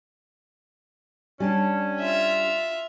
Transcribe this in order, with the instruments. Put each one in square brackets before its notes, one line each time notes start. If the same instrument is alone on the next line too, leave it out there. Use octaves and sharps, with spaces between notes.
[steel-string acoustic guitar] G3 D4 A5 [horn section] C#4
[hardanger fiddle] F4 E5